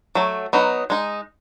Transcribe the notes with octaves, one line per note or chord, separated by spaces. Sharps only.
F#3 A3
F#3 B3 D#4
G#3 D#4